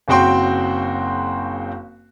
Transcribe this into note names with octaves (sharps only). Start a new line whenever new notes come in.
F#1 C#3 C4 F#4 G5 C6